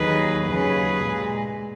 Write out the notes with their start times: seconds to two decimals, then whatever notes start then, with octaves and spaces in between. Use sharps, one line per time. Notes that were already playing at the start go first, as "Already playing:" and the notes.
Already playing: D#2 D#3 F#3 G#4 B4
0.46 D#2 C#3 F#3 G#4 B4
1.02 A#2 G#3